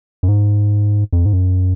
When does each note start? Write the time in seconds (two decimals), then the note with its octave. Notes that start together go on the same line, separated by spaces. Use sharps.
0.23 F#2
0.28 G#2
1.13 F2
1.26 G#2
1.33 F#2